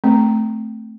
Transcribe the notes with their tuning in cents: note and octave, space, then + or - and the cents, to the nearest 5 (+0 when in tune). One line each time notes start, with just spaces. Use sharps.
A3 +0 C4 +0